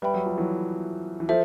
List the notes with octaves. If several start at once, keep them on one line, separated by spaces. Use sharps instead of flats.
G3 B4 E5 G5 B5
F#3
F3
E3 F#3
E3
F3 A4 C5 E5